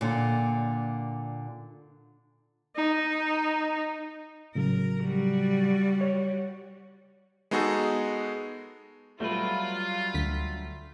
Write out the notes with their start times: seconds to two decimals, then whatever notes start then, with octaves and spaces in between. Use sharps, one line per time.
0.01 A#2 D3
2.76 D#4
4.55 A2 C#3 F#3 A#4
5.04 G3 F#4
6.01 C#5
7.51 G#3 B3 D#4 F#4 G#4 A4
9.20 F#3 G3 A3 F4 B4
10.14 D2 B6